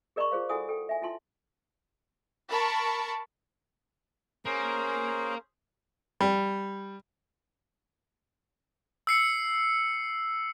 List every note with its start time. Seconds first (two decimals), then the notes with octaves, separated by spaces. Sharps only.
0.16 G#4 A#4 D5 A#5 B5 C#6
0.32 F4 G#4 C5 F5
0.49 E4 F#4 A4 F#5 G#5 D#6
0.69 A4 G5
0.89 E5 G#5
1.02 E4 F4 A5 C6
2.49 A#4 A5 B5 C#6
4.46 A#3 C#4 G#4 C5
6.21 G3
9.07 E6 C7 C#7